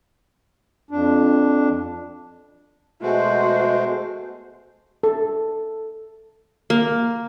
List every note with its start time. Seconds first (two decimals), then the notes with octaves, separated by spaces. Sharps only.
0.91 F2 D4
3.02 B2 G#3 A3 F#4 C5
5.03 A4
6.70 A#3